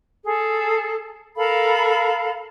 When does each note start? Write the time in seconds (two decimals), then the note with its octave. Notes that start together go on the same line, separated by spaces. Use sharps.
0.24 G#4 A4
1.36 A4 A#4 F5 B5